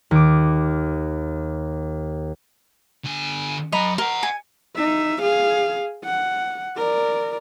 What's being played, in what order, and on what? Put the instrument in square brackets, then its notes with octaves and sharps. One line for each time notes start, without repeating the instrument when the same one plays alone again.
[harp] D#2 D6
[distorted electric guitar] D3 G#5
[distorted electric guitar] F#3 G#5 [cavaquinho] D#5 A#5 B5
[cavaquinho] A#4 [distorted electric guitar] D#5 F#5
[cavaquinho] G#5
[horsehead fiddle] D#4 E5
G#4 F5
F#5
A#4 D5